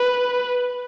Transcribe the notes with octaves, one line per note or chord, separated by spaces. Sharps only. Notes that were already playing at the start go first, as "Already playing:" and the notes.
Already playing: B4